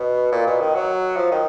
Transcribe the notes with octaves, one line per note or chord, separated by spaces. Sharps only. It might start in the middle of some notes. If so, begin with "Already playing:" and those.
Already playing: B2
A#2
B2
D#3
F#3
F3
D#3